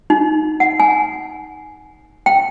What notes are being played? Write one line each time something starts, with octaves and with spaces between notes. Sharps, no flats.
D#4
F#5
G#5
G5